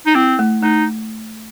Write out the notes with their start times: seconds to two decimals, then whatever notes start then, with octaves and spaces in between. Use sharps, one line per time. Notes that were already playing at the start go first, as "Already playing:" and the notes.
0.06 D#4
0.15 C4 E4
0.39 A3
0.63 A3 D#4